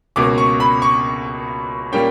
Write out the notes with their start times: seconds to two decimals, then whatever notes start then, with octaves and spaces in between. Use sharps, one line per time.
0.16 C#2 B2 A#3 C#4 D6
0.38 C#6
0.60 B5
0.82 C#6
1.92 A#2 G3 A#3 C#4 G5